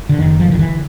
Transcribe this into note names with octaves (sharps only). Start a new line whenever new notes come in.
D3
F#1 D#3
F3
D3 D#3
E3